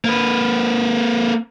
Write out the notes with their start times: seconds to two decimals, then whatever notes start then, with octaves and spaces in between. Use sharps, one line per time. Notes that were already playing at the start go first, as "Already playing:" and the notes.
0.05 A#3 B4